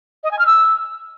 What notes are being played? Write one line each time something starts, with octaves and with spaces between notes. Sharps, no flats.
D#5
G#5
F6
E6